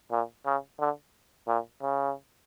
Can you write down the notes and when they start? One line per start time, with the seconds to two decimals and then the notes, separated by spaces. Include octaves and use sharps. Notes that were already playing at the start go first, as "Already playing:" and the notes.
0.11 A#2
0.46 C#3
0.79 D3
1.47 A#2
1.82 C#3